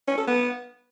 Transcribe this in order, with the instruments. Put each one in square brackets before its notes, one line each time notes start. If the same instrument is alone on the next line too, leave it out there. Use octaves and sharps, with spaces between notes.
[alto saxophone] C#4
A4
B3